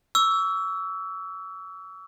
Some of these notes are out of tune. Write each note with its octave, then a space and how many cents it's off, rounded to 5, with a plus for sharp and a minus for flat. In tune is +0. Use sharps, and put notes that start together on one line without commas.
C#6 +40 E6 +0